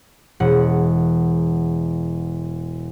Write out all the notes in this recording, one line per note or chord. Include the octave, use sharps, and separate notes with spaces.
E1 F#5